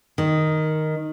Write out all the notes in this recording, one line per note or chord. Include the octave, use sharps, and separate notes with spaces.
D#3